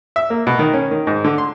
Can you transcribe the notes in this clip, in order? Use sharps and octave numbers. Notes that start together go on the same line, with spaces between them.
E5
A#3
B2
D#3
C#4
D#3
G#2
D3
C6